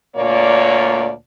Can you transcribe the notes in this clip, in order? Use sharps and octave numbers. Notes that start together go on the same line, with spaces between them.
D2 A#2 A#3 C#5 D5